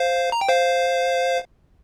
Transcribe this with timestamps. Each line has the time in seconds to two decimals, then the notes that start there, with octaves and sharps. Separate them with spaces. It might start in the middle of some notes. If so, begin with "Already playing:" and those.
Already playing: C5 F5
0.32 A#5
0.41 G5
0.49 C5 F5